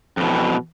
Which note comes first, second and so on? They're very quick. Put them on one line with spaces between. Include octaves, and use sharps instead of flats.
F2 E3 B2